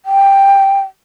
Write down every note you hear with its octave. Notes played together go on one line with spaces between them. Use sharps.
G5